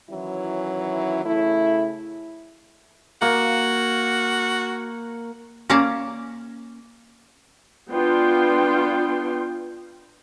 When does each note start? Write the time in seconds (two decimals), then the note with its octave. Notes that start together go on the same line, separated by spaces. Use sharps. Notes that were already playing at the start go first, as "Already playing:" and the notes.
0.10 D#3 E3 F#3 C#4 E4
1.25 C#3 A3 E4
3.22 A#3 F#4
5.70 A#3 C#4 D5 F5 A5 A#5
7.92 B3 D4 F4 G5 C6